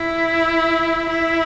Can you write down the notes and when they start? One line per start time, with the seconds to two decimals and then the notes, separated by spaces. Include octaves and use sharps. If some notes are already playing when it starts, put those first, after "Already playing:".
Already playing: E4
1.09 E4